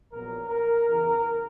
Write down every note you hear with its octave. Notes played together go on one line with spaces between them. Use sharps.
A#1 A#2 F#3 B3 A#4
A#4
E2 C#3 E3 A#4